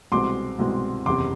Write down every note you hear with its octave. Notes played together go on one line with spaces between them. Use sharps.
C2 B2 G#3 C4 C6 D6
C2 B2 G#3 C4
F#1 E2 C3 C6 D6